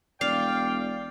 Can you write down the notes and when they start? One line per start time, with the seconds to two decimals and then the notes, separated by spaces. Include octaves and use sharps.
0.21 E1 D5 F5 G5